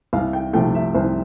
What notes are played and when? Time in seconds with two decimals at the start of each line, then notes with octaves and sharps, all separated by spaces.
0.13 C2 F5
0.33 G5
0.53 C3 F3 A3 G5
0.75 E5
0.94 C2 C5